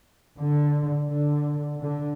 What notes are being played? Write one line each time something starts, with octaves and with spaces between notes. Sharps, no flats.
D3
D3
D3